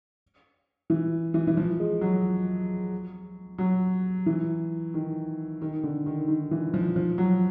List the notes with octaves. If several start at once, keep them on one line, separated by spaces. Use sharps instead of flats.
E3
E3
E3
F3
G#3
F#3
F#3
E3
D#3
D#3
D3
D#3
D#3
E3
F3
F3
F#3